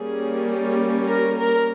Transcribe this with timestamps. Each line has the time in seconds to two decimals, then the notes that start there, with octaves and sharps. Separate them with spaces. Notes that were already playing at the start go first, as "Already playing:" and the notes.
Already playing: G3 A#3 C#4 G#4
1.08 A#4
1.38 A#4